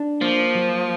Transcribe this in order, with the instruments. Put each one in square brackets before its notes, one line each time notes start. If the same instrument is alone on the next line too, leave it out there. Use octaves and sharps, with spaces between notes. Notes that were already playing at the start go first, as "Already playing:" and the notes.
Already playing: [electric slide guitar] D4
[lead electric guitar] F3 [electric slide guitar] A#3
[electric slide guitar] F#3